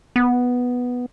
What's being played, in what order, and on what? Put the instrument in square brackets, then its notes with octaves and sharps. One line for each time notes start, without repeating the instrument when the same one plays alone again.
[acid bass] B3